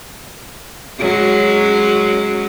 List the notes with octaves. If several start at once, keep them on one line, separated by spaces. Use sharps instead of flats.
F#3 G#3 C#4